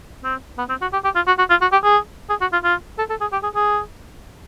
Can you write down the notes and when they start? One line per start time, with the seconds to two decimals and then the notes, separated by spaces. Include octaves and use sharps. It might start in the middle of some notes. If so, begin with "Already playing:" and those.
0.24 C4
0.58 B3
0.69 C4
0.82 F#4
0.93 G4
1.04 G4
1.16 F4
1.27 F#4
1.39 F#4
1.50 F4
1.62 F#4
1.73 G4
1.84 G#4
2.30 G#4
2.41 F#4
2.53 F4
2.64 F4
2.99 A4
3.10 A4
3.21 G#4
3.33 G4
3.44 G#4
3.55 G#4